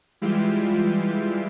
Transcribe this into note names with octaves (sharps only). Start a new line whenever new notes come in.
E3 G3 G#3 E4 F4 G4